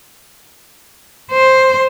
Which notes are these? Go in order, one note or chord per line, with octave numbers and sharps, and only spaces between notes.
C5